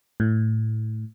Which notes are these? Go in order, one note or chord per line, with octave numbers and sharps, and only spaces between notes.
A2